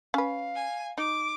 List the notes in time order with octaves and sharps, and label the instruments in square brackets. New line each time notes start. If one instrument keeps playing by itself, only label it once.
[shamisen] C#4 B4 [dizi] F5
[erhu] G#5
[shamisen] D#4 [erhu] D6